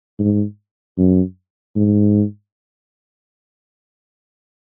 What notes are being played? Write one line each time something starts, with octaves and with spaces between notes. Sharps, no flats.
G#2
F#2
G#2